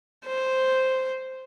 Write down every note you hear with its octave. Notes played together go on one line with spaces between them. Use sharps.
C5